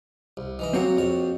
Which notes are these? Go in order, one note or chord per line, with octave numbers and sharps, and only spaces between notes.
C2
D#3 E3 D#5
F#3 A#3 C4 F#4 C#5
A#1 F2 C#5